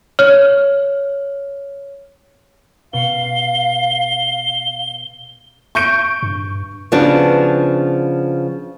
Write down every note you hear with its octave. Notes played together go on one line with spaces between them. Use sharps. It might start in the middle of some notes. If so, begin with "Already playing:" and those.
C#5 F6
B2 F5 C#7 G7
C#6 G6 D7
G2
C#3 F3 B3 D4 F#4